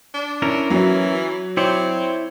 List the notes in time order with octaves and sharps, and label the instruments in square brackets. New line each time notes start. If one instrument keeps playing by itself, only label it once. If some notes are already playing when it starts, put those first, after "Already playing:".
[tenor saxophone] D4
[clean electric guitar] C#4 E4 A#4
[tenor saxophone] E3 [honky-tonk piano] F#3
[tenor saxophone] C4 [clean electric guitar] E4 C#5 D5